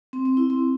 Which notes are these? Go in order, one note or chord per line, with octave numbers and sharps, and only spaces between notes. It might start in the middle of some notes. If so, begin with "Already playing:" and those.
C4
C4
E4
C4